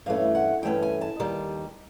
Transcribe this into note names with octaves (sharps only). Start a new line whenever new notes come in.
G2 E3 A3 C#4 F5
F#5
G2 E3 A3 C#4 G5
G#5
A5
D#2 D#3 G3